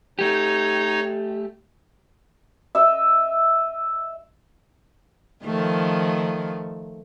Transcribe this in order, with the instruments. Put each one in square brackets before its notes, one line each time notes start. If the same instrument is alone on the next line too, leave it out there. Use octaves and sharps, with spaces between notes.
[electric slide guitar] A3 G4 [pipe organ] D#4 C#5
[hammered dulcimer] D#5 E5
[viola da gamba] D#3 F3 A3